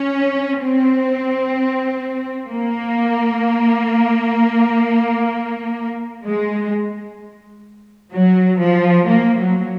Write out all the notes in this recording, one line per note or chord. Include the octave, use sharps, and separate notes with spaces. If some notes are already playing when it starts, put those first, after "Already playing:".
Already playing: C#4
C4
A#3
G#3
F#3
F3
A#3
F#3